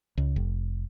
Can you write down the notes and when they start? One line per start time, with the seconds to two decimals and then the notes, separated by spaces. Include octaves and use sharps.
0.17 C#2
0.36 F1